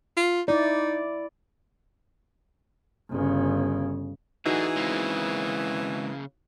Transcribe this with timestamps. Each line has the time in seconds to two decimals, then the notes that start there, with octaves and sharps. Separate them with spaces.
0.17 F4
0.48 D#4 E4 D5
3.10 G1 C#3
4.46 A2 D3 E3 D#4 F#4 G#4
4.76 C#3 G#3 A#3 C4